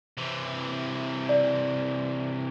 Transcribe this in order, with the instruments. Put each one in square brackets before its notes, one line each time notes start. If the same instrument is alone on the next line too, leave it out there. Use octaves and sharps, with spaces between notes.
[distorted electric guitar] C3 E3
[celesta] D5